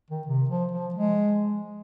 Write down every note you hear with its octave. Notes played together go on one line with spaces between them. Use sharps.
D#3
C3
F3
F3
G#3